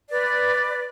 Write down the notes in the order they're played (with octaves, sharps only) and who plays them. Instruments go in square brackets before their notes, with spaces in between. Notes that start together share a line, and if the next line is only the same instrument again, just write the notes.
[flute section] B4 D5